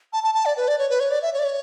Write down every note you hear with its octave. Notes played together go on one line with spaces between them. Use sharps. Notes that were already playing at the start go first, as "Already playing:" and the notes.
A5
A5
A5
D5
B4
D5
C#5
B4
C#5
D5
E5
C#5
D5
C#5